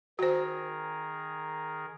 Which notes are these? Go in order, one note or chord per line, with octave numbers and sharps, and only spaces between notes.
D#3 F#4 G#4 A#4 C5